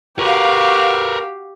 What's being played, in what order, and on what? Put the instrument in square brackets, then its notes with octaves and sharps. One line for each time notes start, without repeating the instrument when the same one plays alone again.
[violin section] F#4 F5 [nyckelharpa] G4 [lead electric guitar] A#4 B4